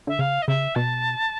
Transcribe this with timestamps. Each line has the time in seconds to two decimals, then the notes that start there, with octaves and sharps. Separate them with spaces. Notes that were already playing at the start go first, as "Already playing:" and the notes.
0.07 D3 E5
0.19 C#3 F5
0.42 D#5
0.47 C#3 E5
0.75 B2 A5